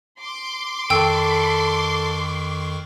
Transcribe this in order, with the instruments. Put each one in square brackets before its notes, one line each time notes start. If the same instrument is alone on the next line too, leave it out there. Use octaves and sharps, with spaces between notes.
[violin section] C6 D6
[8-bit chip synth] F2 D#3 C#6 [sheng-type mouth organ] A4 [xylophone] G5 E6